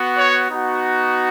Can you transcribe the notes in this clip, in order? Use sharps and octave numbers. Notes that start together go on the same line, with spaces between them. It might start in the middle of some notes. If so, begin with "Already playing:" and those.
Already playing: B3 F#4
C#5
B3 D#4 F#4